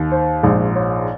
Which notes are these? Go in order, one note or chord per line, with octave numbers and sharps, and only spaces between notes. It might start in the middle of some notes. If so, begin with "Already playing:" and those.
Already playing: D#2 D#3
C5
A#1 G#2 F3
C#5